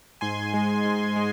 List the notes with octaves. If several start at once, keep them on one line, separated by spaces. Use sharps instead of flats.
G#2 G#5 C6
G#3
G#2
G#3